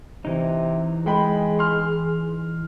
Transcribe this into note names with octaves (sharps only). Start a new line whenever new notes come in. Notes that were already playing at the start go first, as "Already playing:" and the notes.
C3 E3 D#4
G#3 G#4 G5 B5
C6 F6